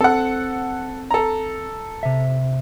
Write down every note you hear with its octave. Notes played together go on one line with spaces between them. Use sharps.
C4 A4 F#5
A4 A#5
C3 E5